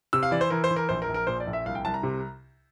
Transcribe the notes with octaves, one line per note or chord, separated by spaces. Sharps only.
C3 E6
F5
E3 D5
C5
E3 A#4
C5
E3
A#4
A#1 C5
A#4
A#1
A#4
A#2 C5
D5
A#1
E5
C2 F5
G5
C2 A5
A#5
C3